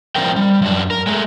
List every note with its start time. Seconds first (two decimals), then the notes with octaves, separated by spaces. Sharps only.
0.15 A2 F3 C4 D4 A#4 G5
0.36 G3
0.62 F#2 D4
0.91 A#4
1.07 G#3 A3